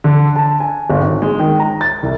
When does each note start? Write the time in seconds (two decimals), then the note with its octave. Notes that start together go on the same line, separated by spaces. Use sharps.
0.04 D3
0.36 A5
0.60 G#5
0.90 G1
1.01 G#1
1.22 G#3
1.39 D#3
1.60 A#5
1.81 A6
2.03 C2